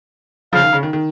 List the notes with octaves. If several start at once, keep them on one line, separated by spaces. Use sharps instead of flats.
C#3 F3 F5
D#3
C#3
D#3
D#3